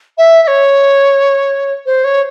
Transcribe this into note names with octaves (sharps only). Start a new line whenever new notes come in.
E5
E5
C#5
C5
C#5